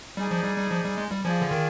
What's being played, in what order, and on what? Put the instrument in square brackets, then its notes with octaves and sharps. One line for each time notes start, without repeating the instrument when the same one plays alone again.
[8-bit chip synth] G3 [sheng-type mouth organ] D#4 G#4 D5 G#5
[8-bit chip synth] F3
G3
G3
F3
G3
G#3
G3
[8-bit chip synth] F3 [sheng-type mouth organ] F4 G#4 D5 G#5
[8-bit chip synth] D3
D#3